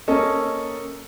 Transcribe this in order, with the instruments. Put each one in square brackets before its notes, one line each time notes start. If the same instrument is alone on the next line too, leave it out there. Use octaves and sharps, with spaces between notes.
[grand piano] A#3 C#4 A4 D#5